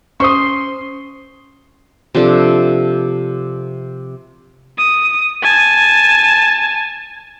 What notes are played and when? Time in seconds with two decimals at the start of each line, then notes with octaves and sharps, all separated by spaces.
0.20 C#4 C5 C6 C#6 D#6
2.15 C3 F3 D4 A4
4.78 D#6
5.43 G#5 A5